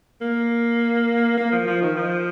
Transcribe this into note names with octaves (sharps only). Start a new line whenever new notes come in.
A#3
A#3
F3
F3
D#3
F3